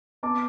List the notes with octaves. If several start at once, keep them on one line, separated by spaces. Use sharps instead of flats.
B3 A5 D6